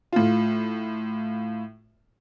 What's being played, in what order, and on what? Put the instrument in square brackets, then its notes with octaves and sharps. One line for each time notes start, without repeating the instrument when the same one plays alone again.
[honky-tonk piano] A2 F4